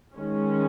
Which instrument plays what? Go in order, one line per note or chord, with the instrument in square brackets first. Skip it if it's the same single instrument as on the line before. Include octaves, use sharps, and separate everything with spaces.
[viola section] D#3 G#3 C#4